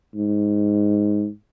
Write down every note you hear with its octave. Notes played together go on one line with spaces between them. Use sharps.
G#2